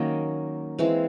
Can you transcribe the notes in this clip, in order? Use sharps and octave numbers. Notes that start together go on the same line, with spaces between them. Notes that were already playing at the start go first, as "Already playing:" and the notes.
Already playing: D#3 F#3 A#3 C#4 D#5
E3 G#3 C4 F5